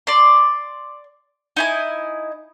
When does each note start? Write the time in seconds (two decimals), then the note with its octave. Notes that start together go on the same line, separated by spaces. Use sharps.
0.07 D5 C6
1.56 D#4 E4 G#5